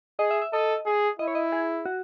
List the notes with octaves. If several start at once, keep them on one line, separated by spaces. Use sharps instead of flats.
G#4 D#5
E5
E5
A4 D#5
G#4
E4 D#5
C#5
D#5
G#4
F#4